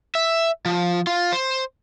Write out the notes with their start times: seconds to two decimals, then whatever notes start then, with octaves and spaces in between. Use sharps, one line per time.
0.15 E5
0.66 F3
1.07 F4
1.32 C5